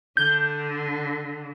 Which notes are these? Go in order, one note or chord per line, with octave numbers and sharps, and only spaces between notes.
D3 G6